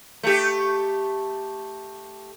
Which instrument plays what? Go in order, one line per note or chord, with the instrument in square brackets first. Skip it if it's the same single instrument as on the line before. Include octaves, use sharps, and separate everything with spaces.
[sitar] A3 G4